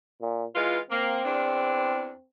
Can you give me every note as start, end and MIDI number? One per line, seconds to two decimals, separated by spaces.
0.21 0.45 46
0.55 0.77 52
0.55 0.77 56
0.55 0.77 65
0.55 0.80 71
0.90 1.20 58
0.90 2.26 60
1.24 2.11 40
1.24 2.11 62